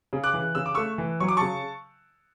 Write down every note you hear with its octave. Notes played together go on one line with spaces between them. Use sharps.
C#3
D6 F#6
E3
C#3 E6
D6
A3 C#6 E6
E3
F#3 C#6
D6
C#3 A5 C#6